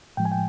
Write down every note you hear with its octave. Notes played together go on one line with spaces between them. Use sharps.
A2 F3 G#3 G5
G#5
G5